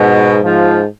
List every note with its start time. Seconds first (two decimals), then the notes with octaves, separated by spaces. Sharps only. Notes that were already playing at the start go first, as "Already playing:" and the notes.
Already playing: G#2 B2
0.43 G#2 F3